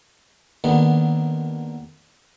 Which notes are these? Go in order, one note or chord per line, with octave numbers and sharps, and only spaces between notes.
D#2 D3 D#3 B3